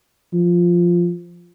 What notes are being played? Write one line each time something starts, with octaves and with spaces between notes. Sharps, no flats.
F3